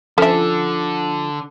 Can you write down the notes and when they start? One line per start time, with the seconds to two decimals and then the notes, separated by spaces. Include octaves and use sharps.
0.18 D3 F3 C#4 A4 E5